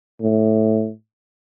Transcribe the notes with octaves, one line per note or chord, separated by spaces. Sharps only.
A2